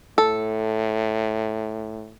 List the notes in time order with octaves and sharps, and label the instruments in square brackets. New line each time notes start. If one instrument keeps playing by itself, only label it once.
[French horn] A2 [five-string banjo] A4